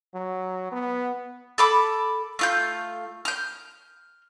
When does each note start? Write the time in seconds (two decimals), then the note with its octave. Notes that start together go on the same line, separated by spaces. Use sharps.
0.14 F#3
0.72 B3
1.58 A4 B5 D6
2.39 A3 F4 G6
3.25 F6 G6